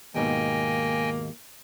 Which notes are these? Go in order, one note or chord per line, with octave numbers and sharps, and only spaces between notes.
D#2 G#2 B2 A#3 D#5 G5 G#5